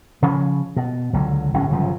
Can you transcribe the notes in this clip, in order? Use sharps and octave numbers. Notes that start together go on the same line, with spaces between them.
C#3 F3 C#4
B2
C#2 D3 F#3
G1 A2 C#4
G1 C#3 F3 F#3